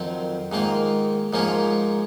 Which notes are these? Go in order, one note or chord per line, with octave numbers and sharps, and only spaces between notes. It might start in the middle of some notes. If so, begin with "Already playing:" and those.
Already playing: F2 D#3 F#3 C4 F4
G#2 D#3 A#3 F4
G#2 F3 A#3 C#4 F4